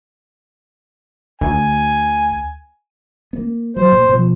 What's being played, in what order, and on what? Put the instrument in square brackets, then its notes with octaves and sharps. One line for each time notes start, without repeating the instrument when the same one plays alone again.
[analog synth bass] D2 [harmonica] G#5
[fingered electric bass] A#3 B3
[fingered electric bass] F#3 [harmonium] C5
[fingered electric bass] A#2
B2 F3